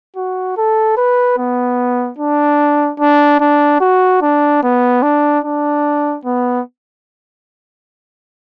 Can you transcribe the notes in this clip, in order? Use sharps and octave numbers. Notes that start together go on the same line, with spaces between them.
F#4
A4
B4
B3
D4
D4
D4
F#4
D4
B3
D4
D4
B3